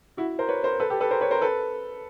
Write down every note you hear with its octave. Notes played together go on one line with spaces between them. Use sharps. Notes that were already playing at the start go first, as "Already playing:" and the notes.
E4 F#4
A#4 C5
B4 C#5
A#4 C5
A4 B4
G4 A4
A4 B4
A#4 C5
B4 C#5
A#4 C5
A4 B4